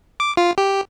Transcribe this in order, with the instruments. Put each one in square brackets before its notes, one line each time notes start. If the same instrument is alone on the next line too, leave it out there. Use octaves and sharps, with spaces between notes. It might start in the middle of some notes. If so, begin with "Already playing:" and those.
[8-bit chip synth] D6
F4
G4